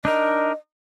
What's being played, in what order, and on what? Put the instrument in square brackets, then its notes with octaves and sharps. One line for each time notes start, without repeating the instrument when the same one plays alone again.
[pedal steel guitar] D4 D#4 A#4 [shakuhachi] D#5